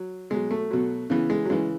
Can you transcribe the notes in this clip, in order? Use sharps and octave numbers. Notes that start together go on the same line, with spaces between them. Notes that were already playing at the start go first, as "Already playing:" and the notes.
Already playing: F#3
B2 F#3 G#3
A3
B2 F#3
C#3 E3 B3
G#3
F#3
C#3 E3 G#3